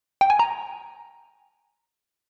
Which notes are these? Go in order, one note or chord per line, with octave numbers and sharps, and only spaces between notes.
G5
G#5
A#5